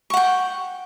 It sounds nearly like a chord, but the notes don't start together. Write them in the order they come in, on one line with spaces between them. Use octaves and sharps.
C#6 F#5 G5